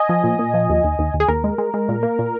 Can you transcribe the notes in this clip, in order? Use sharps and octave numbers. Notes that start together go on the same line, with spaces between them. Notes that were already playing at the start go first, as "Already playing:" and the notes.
Already playing: D#5 G#5
F3
A#2
A#2
F3
D#2
D#2
D#2
D#2
G#4
D#2 A#4
G#3
G#3
G#3
A#2
A#3
A#2